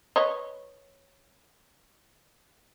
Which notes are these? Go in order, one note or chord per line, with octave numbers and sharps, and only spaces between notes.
B4 C#5 D#5